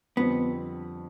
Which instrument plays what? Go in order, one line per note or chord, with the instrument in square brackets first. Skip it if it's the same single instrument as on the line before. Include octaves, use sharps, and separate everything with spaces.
[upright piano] F2 D3 G3 C4 [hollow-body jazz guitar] B3